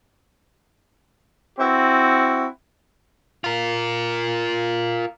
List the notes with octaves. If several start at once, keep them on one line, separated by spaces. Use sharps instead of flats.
C4 E4 F#4
F4 A#4